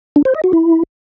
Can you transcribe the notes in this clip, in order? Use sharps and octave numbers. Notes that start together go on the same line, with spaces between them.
D4
C5
D#5
F#4
E4